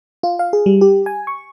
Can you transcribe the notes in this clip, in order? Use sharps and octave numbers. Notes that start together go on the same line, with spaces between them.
F4
F5
G#4
G3
G4
G#5
C#6